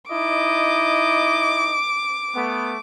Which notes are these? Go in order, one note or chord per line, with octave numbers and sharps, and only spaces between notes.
D#4 E4 D#5 D6
A3 B3